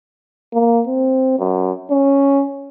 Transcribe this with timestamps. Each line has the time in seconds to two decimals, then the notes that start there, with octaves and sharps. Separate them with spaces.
0.54 A#3
0.87 C4
1.39 F#2
1.91 C#4